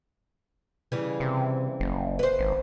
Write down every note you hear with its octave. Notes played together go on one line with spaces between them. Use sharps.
C#3 E3 G3
C3
F#1
B4 C5
G#1